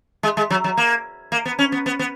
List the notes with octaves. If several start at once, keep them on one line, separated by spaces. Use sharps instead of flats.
G#3
G#3
F#3
F#3
A#3
A#3
B3
C#4
B3
B3
B3